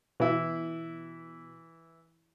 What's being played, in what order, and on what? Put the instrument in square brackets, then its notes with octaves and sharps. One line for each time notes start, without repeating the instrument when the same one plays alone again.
[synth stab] B2 [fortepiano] E3 E4